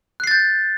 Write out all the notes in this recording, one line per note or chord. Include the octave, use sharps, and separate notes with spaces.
F#6 G6 A6 C7